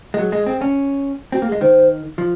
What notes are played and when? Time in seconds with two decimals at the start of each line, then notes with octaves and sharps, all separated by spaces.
0.14 G#3
0.18 F#3 G#4
0.32 G#3
0.46 C4
0.61 C#4
1.32 C4 F#4
1.42 A#3
1.48 G#4
1.52 G#3
1.61 D#3 C5
2.18 F3